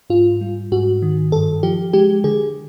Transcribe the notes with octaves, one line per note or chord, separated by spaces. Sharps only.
G#2 F4
G3
G#2 F#4
D#3
G2 A4
F3 G4
G#3 G4
D3 G#4